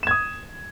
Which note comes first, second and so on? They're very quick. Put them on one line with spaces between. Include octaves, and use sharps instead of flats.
E7 G#6 D#6